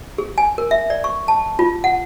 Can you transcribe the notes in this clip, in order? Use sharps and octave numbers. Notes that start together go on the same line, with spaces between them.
G#4
G#5
A#4
E5
D5
C#6
A5
F4
F#5